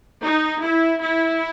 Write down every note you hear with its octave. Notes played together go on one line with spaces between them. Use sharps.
D#4
E4
E4